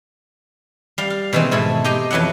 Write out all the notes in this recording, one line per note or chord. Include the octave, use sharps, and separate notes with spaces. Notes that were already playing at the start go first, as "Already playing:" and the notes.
G3 F5
F5
B2 D#3 E3 G#3 C4
G#2 B2 E4 A4
D#4 G4 D#5 G5 C6
F2 E3 F#3 E4 F#5